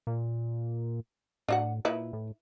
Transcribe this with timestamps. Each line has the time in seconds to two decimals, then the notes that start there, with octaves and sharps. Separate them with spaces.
0.07 A#2
1.49 A2 D4 F#4 F#5
1.85 A#2 D#4 E4 B4
2.13 A2